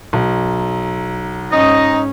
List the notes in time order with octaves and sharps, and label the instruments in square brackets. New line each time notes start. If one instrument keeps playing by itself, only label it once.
[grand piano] B1
[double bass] G#2 C#4 [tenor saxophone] D#4 [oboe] D#5